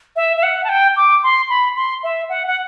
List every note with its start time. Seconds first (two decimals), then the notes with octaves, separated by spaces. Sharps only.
0.16 E5
0.37 E5
0.43 F#5
0.64 A5
0.69 G5
0.97 D6
1.23 C6
1.50 B5
1.76 C6
2.03 E5
2.29 F#5
2.47 F#5